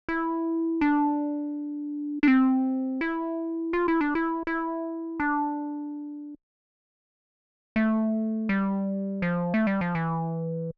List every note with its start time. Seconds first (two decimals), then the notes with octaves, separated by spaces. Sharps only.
0.09 E4
0.81 D4
2.23 D4
2.28 C4
3.01 E4
3.73 F4
3.88 E4
4.01 D4
4.15 E4
4.47 E4
5.20 D4
7.76 A3
8.49 G3
9.22 F3
9.54 A3
9.67 G3
9.81 F3
9.95 E3